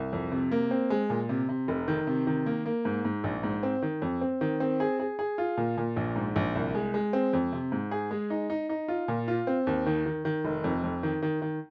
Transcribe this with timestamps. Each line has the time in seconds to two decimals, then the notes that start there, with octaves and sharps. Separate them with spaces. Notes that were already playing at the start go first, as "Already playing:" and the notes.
Already playing: C2
0.13 F2
0.32 C3
0.51 A#3
0.71 C4
0.90 G#3
1.10 A#2
1.29 C3
1.49 C3
1.68 F1
1.88 D#3
2.07 C3
2.27 D#3
2.46 A#3
2.66 A#3
2.85 G#2
3.05 G#2
3.24 A#1
3.43 G#2
3.63 C4
3.82 D#3
4.02 F2
4.21 C4
4.41 D#3
4.60 C4
4.80 G#4
4.99 G#4
5.19 G#4
5.38 F4
5.57 A#2
5.77 A#2
5.96 A#1
6.16 G#2
6.36 A#1
6.55 C2
6.75 G#3
6.94 G#3
7.13 C4
7.33 F2
7.52 C3
7.72 G#2
7.91 G#4
8.11 G#3
8.30 D#4
8.50 D#4
8.69 D#4
8.88 F4
9.08 A#2
9.28 F4
9.47 C4
9.67 D#2
9.86 D#3
10.06 D#3
10.25 D#3
10.45 F1
10.64 F2
10.84 F2
11.03 D#3
11.22 D#3
11.42 D#3